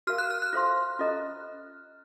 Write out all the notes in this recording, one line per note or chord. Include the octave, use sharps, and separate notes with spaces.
F#4 A#4 F5 F6
F#6
F6
F#6
F4 A4 C5 F5 C6
C#4 F4 A4 D#5 A#5